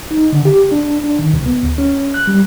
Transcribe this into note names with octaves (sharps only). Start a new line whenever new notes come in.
D#4
D3
G4
D4
D4
D#3
C2
B3
D2
C#4
F#6
G3